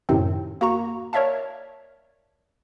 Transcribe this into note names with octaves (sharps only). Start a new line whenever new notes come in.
F#2 A2 C3 D#3 C4
A#3 F#4 A#5 C#6
A#4 C#5 D5 E5 F5 A5